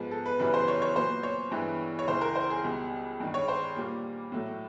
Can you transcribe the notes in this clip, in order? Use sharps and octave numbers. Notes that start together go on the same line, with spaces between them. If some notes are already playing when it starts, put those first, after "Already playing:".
Already playing: G#2 F3 G#3 B3
A4
B4
F#2 C#3 E3 G3 B3 B4
C5
C#5
C#5
A#2 F#3 B3 C5
C#5
G2 E3 G#3 B3
C#5
C#2 C#3 E3 C5
A#4
C5
G#4
C#2 B2 G3
G2 D#3 G#3
C#5
C5
A#2 G3 A#3
A2 F#3 A3